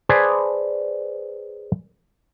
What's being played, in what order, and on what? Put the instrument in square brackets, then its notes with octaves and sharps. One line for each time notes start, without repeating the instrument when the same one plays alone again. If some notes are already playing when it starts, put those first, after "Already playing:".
[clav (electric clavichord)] G#4 B4 C5 D5 G#5 A5